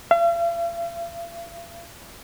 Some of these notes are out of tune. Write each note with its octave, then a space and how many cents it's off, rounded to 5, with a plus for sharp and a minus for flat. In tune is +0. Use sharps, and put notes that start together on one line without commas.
F5 -45